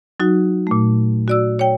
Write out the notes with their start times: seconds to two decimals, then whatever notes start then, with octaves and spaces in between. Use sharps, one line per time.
0.20 F#3 D#4 F#4
0.67 A#2 A3
1.28 F#4 D5 E6
1.59 C#5 G5